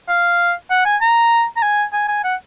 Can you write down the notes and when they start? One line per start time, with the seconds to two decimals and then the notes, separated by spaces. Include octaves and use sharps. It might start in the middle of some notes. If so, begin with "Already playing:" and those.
0.09 F5
0.70 F#5
0.85 G#5
1.01 A#5
1.57 A#5
1.62 G#5
1.93 G#5
2.08 G#5
2.24 F#5